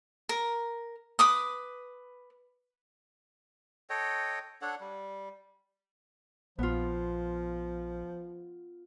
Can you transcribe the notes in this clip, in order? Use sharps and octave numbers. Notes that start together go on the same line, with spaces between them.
A#4
B4 D6 D#6
A4 C#5 D#5 G5
D4 A4 C#5 F#5
G3
A#1 F3 B3 F4